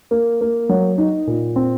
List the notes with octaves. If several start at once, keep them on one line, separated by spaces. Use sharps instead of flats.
A#3
A#3
F#3
D#4
A#2
C4